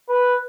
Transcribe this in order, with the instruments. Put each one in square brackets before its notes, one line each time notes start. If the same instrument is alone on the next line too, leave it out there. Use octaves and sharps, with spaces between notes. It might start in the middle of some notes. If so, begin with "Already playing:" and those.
[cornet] B4